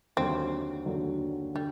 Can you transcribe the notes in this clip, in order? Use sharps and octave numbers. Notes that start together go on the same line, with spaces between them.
D#2 D3 F#3 C4
D#2 D3 F#3
D3 G3